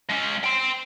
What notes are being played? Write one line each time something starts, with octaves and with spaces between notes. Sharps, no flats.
G#3 C#4
G5 C6